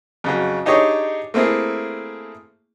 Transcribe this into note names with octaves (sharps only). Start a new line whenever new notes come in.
F2 C#3 F#3
D4 D#4 G4 G#4 C#5 D#5
A3 A#3 C4 E4 G#4